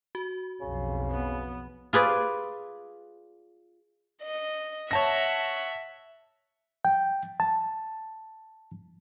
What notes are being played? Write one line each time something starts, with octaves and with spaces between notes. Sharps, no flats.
F#4
B1 F2 C#3
B3
F4 G#4 B4 D5
D#5
C#5 E5 F#5 A5 A#6
G5
A5